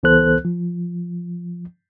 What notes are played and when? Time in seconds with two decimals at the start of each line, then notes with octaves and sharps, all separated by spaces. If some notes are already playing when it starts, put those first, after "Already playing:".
0.03 C#2 E3 B3 A4 C5 F#6
0.45 F3